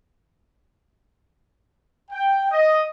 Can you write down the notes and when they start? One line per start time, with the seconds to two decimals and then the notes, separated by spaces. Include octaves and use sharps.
2.11 G5
2.52 D#5